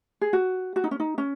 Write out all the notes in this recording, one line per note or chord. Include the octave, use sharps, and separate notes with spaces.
G#4
F#4
F#4
D#4
C#4
D#4
C#4